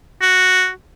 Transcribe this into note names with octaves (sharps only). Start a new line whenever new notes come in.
F#4